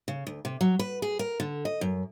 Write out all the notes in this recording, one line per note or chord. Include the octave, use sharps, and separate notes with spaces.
C#3
D2
C3
F#3
B4
G#4
A#4
D3
D#5
F#2